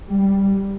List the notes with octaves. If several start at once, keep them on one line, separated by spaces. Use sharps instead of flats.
G3